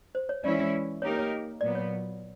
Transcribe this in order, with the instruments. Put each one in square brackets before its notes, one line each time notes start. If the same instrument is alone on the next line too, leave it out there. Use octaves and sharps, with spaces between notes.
[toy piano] C5
C#5
[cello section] E3 G#3 C#4 E4 [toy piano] D5
[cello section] A#3 D#4 G4 A#4 [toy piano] C#5
[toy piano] C#5
[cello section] A#2 F#3 B3 [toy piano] D5
[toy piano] C#5